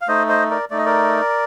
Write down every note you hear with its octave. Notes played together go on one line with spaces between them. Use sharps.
F5
A3 D#4 C5 D#5
C5 D#5
A#4 D5
A3 D#4 D5
D#5
A#4 D5